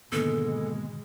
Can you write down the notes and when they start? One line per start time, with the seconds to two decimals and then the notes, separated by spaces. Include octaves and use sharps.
0.12 G#2 B2 D3 D#3 G#3 A#3 B3 A4